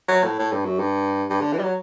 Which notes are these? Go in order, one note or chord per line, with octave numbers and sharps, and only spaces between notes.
F#3
A2
A2
G2
F#2
G2
G2
D3
E3
G3
F#3